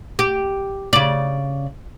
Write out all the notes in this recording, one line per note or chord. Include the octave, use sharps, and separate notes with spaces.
G4
C#3 D5